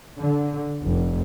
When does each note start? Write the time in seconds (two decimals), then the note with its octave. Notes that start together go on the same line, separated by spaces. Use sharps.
0.18 D3
0.84 F1